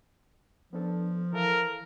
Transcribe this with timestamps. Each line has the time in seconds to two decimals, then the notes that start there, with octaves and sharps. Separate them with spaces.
0.73 F3 B3 D4 A4
1.33 E3 A4 A#4 F5